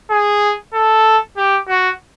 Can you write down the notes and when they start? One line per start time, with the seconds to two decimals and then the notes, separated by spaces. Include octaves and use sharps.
0.10 G#4
0.74 A4
1.37 G4
1.68 F#4